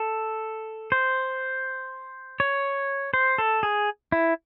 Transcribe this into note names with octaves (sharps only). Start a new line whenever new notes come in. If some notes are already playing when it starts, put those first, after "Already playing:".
Already playing: A4
C5
C#5
C5
A4
G#4
E4